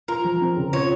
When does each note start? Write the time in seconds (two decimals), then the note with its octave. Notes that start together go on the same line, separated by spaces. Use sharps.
0.08 F4 A#4
0.24 F3
0.41 C4
0.57 C#3
0.73 F4 C#5